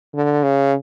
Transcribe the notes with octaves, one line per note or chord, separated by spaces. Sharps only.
D3
C#3